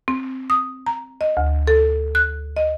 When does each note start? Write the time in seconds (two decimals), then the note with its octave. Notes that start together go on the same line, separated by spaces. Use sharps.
0.08 C4
0.50 D#6
0.86 A#5
1.21 D#5
1.37 D2
1.67 A4
2.15 F#6
2.56 D#5